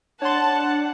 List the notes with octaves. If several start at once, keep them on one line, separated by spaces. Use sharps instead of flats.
D4 C#5 F#5 A5 C6